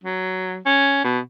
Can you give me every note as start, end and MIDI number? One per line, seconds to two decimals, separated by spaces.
0.04 0.57 54
0.66 1.04 61
1.04 1.19 47